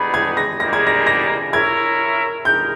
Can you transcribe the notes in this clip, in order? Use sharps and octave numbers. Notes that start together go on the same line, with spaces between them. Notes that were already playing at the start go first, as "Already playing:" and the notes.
Already playing: G3 B3 D#4 G#4 B5
G#6
A#6
G3 A#3 D#4 G#4 A#6
G#6
A#6
A#6
E4 A#4 C#5 E5 G#6
D#4 A#4 G6